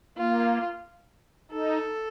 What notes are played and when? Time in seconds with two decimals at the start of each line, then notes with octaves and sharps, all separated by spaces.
0.17 A#3 F4
1.51 D#4 A4